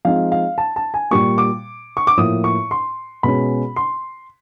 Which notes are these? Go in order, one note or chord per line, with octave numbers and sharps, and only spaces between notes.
F3 G#3 C4 D#4 F5
F5
A5
A5
G#5
A#2 G3 A#3 C#6
D6
C#6
D6
A2 F3 A#3 D#6
C#6
C6
B2 G#3 C#4 B5
C6